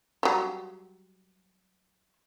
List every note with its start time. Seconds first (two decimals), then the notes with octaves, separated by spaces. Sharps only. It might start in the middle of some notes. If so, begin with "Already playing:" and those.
0.23 F#3 G3